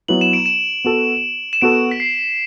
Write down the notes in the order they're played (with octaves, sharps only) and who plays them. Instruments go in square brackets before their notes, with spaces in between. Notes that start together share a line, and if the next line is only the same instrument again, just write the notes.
[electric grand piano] F#3 B3 E4 B4 [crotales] F#7
[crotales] E7
D7
E7
[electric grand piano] B3 F#4 A4
[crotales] E7
[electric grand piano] B3 F#4 A4 [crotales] D7
[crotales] B6
C7